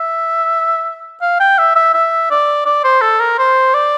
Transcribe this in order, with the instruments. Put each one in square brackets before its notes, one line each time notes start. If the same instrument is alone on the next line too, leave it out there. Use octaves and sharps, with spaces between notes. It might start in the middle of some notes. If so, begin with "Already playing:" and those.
Already playing: [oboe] E5
F5
G5
E5
E5
E5
D5
D5
C5
A4
A#4
C5
D5